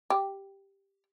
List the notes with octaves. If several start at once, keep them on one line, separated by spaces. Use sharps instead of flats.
G4